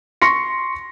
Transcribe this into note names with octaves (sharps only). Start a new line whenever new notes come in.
C6 C#6 A#6 C#7